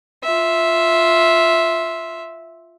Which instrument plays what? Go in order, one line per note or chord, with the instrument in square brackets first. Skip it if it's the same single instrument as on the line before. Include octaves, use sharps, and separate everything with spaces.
[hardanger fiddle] F4 E5